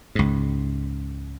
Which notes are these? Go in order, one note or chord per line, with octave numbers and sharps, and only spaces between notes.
C#2 G#2